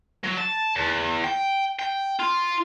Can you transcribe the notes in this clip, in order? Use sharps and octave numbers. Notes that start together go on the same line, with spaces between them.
F#3
A5
E2
G5
G5
F4